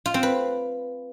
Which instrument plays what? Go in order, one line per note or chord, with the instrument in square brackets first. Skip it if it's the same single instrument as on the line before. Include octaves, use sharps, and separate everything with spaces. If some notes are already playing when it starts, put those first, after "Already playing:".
[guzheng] F4
C4
B4